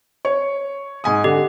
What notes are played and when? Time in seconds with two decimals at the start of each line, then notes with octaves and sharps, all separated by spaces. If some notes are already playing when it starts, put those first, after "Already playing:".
0.25 C#5
1.04 G#2 G#5 D#6
1.24 D3 G4